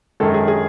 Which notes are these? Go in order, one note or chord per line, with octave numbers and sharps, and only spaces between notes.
F#2 D#3 G#3 A4
G#4
G#4